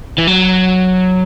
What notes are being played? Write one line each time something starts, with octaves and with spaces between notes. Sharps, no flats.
E3
F#3